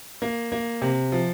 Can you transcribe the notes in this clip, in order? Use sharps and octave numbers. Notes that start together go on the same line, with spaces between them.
A#3
A#3
C3
F3